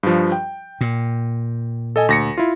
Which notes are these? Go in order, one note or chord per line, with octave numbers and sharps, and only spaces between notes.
G2 F3
G5
A#2
A4 D#5 G#5
D2 A#6 C#7
E4 F4